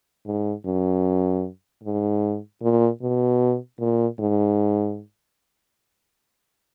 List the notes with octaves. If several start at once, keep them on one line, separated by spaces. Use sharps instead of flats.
G#2
F#2
G#2
A#2
B2
A#2
G#2